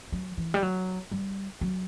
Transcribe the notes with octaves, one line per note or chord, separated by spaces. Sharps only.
F#3
E3
G3
F#3
G3
F#3